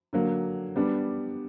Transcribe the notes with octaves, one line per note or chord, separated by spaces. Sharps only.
D3 F#3 A#3
G3 B3 D4